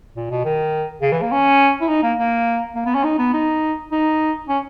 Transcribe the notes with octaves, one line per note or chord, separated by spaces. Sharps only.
A#2
B2
D#3
C#3
E3
A#3
C#4
E4
D#4
A#3
A#3
A#3
B3
C#4
D#4
B3
D#4
D#4
C#4